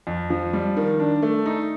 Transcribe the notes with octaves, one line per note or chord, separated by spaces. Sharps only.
F2
F3
G3
D#3
D4
A3
D#4